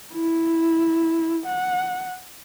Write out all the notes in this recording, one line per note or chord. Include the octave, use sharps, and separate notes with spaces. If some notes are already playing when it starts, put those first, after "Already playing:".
E4
F#5